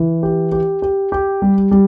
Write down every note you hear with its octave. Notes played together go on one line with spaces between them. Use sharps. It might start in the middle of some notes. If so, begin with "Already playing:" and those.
Already playing: E3
G4
G4
G4
G4
G3
G3